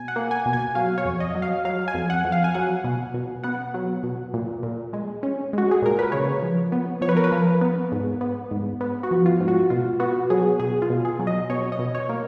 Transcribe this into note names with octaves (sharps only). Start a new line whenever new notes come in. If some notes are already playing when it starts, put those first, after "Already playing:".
Already playing: B2 G#5
F#5
A#3
G#5
B2
G#5
F#3 F5
C#5
F2
D#5
F#3
F5
F#3 F5
G#5
F2
F#5
F2
F5
G#5
F#3 F#5
B2
B2
B3 F#5
F#3
B2
A#2
A#2
G#3
C#4
G#3 F#4
G#4
A#2 A#4
B4
C#3 C#5
F3
B3
F3 C#5
B4
A#4
B4
F3
B3
G#2
B3
G#2
B3
F#4
F3
F4
G#2
F#4
B2 F4
B3 F#4
F#3 G#4
B2 G#4
F4
B2
G#4
F#3
D#5
B2 C#5
D#5
B2
C#5
A#3